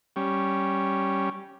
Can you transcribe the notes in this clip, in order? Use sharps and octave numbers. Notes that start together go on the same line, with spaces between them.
G3 C#4